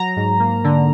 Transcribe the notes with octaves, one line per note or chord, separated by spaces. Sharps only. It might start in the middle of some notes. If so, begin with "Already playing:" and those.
Already playing: F#3 A#5
G#2
A#3
D3